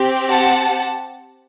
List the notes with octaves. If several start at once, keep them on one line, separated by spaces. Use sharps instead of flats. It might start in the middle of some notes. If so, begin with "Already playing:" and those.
Already playing: C4 G4
F#5 A5